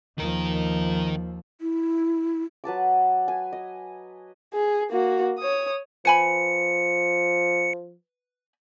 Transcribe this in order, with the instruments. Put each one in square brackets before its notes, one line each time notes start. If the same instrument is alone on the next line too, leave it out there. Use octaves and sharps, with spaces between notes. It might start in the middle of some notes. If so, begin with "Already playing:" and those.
[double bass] D#2 F3 [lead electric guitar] D#3 A#4
[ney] E4
[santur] F#3 B4 A5 D6
G#5
D#5
[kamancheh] G#4
A#3 F#4
C#5 D#6
[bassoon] F3 [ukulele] B4 G#5 B5 [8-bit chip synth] C#7